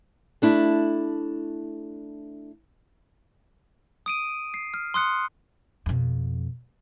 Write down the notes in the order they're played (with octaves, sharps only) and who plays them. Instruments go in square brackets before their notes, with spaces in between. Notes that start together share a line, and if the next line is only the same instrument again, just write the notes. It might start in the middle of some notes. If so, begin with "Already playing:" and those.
[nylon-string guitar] A3 D4 E4
[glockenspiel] D#6 D7 D#7
C7
F6
C6 D#6 F#6 C#7
[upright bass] F2 B2